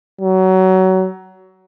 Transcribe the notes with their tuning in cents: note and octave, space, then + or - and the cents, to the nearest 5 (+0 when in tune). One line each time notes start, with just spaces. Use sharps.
F#3 +25